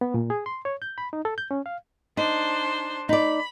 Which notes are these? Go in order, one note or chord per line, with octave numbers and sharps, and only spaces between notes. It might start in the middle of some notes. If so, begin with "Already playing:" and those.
B3
A#2
G#4
C6
C#5
G6
B5
D#4
A4
G6
C#4
F5
D4 D#4 C5
D#4 D5 B5